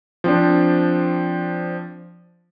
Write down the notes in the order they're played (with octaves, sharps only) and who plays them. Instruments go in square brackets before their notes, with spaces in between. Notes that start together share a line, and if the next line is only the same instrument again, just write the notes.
[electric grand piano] F3 C4 D4